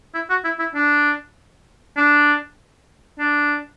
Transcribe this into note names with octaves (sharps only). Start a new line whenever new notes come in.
E4
F#4
E4
E4
D4
D4
D4